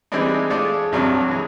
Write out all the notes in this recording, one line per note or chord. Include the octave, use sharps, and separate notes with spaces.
E3 G3 G#3 C4 D4 D#4
G#3 A3 F4 A4 D5
C2 G2 C3 F3 F#3 D4
E3 G#3